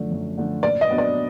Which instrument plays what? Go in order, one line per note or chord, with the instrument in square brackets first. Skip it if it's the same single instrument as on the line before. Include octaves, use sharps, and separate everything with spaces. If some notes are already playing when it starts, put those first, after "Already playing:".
Already playing: [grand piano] F#2 D3 F3 A3 D4
F#2
D3 F3 A3 D4
[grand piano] A#2 [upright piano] D5
[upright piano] D#5
[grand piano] F#3 B3 D4
[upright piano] D5